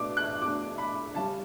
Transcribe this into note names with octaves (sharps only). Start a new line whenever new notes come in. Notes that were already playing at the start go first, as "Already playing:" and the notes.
Already playing: B2 A3 D4 D6
F#6
B2 A3 D4 D6
B5
C#3 G3 C#4 A5